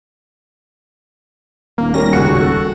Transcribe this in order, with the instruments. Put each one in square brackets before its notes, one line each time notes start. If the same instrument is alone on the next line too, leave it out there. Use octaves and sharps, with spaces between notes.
[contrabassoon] D#1 [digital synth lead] A#3
[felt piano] G3 C#4 A#4 [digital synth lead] A#6
[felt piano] C#2 C#7 [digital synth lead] F#4
[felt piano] A4